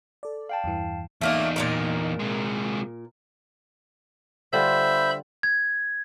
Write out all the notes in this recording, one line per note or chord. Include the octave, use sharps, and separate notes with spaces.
A4 D5
F5 G5 A5
E2 G2 E3
E2 A3 A#3 D4 D#4
A#2 D#3 A#4
C3 G#3
D3 G3 F4 C5 E5 B5 G6
G#6